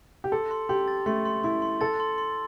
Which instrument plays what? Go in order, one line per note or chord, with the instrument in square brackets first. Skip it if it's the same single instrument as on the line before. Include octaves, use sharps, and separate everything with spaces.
[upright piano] G4
[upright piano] A4 [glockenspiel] C6
[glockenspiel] C6
[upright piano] G4 [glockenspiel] C6
[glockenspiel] A6
[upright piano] A3 [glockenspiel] C6
[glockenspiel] C6
[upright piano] E4 [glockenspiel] C6
[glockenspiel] C6
[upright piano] A4 [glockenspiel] A6
[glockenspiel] C6
C6